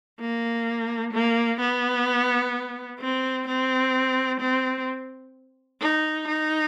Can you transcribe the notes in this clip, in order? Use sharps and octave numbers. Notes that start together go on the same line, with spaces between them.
A#3
A#3
B3
C4
C4
C4
D#4
D#4